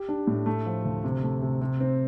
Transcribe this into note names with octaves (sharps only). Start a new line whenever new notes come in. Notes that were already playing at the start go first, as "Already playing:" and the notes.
Already playing: G4
D4
A2
A3
F3
D2
C3
A3
C3
C3
C4